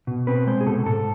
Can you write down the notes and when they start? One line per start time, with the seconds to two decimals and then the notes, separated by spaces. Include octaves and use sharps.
0.07 B2
0.27 C4 B4
0.47 G#3 C5
0.61 G#4
0.66 B2 A4
0.86 G#2 A4